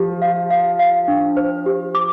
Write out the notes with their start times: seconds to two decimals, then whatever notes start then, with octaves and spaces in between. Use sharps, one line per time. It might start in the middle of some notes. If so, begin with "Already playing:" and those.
Already playing: F3 G4
0.22 F5
0.51 F5
0.79 F5
1.08 D4
1.37 C5
1.66 G4
1.95 D6